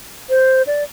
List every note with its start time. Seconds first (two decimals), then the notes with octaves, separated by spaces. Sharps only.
0.29 C5
0.67 D5